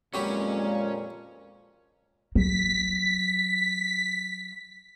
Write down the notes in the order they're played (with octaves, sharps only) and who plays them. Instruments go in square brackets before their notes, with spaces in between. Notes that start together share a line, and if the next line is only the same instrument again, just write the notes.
[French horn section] F2 A#2 [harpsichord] F#3 G4 B5 [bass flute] G#3 [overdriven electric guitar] C#4 C#5
[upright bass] F#3 [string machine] B6